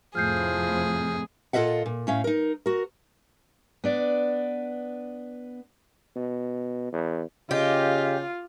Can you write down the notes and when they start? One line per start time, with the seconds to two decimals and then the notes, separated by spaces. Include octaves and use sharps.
0.15 F2 A2 C3 F3 G#4 F6 G6 C7
1.53 A#2 F4 A4 D#5 E5 F#5
1.86 A#2
2.07 A2 C#4 F5
2.24 D#4 A#4
2.66 F#4 A#4
3.84 B3 D4 D5
6.16 B2
6.92 E2
7.51 C#3 F4 G4 D#5